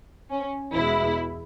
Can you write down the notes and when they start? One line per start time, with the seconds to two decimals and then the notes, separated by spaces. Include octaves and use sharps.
0.30 C#4
0.73 E2 B2 G#3 E4